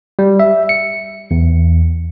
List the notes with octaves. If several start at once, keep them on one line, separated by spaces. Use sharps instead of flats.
G3
E5
C#7
E2